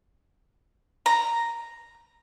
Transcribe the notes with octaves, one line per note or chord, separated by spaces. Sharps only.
A#5